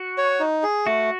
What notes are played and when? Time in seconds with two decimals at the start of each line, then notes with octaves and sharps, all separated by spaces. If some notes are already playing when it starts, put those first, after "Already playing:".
Already playing: F#4
0.18 C#5
0.40 D#4
0.63 G#4
0.86 A3 F#4